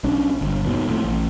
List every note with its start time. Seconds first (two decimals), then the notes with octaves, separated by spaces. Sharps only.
0.04 B1 C#4 D4
0.41 G1
0.66 D#2 B2
0.87 F2 A2
1.04 A1